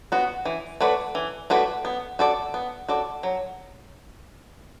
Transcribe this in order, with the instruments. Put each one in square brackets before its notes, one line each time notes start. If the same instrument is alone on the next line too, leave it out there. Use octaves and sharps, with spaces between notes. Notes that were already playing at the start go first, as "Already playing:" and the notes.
[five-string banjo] B3 F#4
E3
A3 F#4 B4 D5
E3
A3 F#4 B4 D5
B3
F#4 A4 D5
B3
F#4 A4 D5
F#3